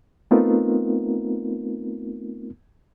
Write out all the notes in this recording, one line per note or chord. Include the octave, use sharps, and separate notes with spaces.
A3 B3 C4 D#4 F4 A#4